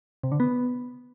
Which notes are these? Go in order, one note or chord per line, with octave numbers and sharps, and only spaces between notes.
C3
D3
B3